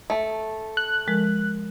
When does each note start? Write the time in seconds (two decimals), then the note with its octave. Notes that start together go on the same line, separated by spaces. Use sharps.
0.10 A3
0.77 F#6
1.07 F3 G#3 A#4